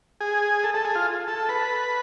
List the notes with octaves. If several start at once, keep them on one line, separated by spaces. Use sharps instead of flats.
G#4
A4
A4
G#4
F4
A4
B4